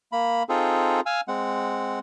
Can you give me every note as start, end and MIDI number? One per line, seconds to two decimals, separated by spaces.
0.12 0.43 58
0.12 0.43 83
0.49 1.01 60
0.49 1.01 63
0.49 1.01 65
0.49 1.01 68
0.49 1.01 69
1.06 1.21 77
1.06 1.21 80
1.06 1.21 88
1.28 1.99 56
1.28 1.99 60
1.28 1.99 78